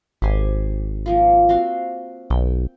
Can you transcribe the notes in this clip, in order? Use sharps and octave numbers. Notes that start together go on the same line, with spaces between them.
G#1 G4 C5 G#5
F3 A#3 F4
C4 F#4 F5
B1 G5